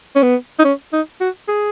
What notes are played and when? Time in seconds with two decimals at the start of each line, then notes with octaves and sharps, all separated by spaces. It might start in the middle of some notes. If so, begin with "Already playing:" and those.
0.15 C#4
0.23 B3
0.59 D#4
0.64 C#4
0.93 D#4
1.21 F#4
1.48 G#4